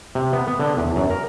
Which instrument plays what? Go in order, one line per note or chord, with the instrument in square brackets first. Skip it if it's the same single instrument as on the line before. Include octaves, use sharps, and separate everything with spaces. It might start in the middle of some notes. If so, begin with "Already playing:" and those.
[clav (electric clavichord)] C3
B3
B3
D3
E2
F#2
A#4